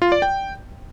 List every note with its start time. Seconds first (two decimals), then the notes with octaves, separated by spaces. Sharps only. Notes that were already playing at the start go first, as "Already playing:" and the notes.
0.02 F4
0.12 D5
0.22 G5